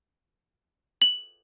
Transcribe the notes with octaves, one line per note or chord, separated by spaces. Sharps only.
F#7